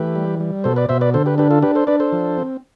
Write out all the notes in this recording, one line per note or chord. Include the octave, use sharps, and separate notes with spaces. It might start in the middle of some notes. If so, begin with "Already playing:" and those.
Already playing: E3 A3 G4 B4
G3
G3
B2 A4 C5
B4 D5
B2 C5 E5
B4 D5
D3 A4 C5
G4 B4
D4 G4 B4
F4 A4
D4 G4 B4
A4 C5
D4 B4 D5
A4 C5
F3
C4